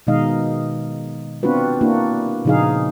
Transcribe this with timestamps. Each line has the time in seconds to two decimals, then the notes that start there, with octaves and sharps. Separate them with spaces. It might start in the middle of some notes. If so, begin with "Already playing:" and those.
0.07 B2 D#3 G#3 D#4 D#5 F5
1.43 B3 C4 D4 F4 F#4 B4
1.81 A#3 D4 E4 F#4
2.45 A#2 C#3 F3 D#4 G#4 F5